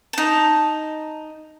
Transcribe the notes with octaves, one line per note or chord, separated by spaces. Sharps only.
D#4 A5